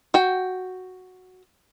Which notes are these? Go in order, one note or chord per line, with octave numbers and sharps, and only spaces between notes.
F#4 G5